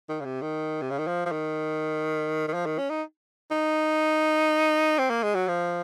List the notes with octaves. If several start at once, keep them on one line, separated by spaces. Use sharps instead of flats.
D#3
C#3
C3
D#3
C3
C#3
D#3
F3
F3
D#3
D#3
F3
D#3
C#4
D#4
D#4
C4
A#3
G#3
F#3
F3